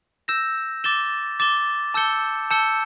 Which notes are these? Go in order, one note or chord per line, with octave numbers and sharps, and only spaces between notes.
E6 G6 A#6 E7
D6 A6 E7 G7
D6 A6 E7 G7
A5 E6 G6 C#7 G7
A5 E6 G6 C#7 G7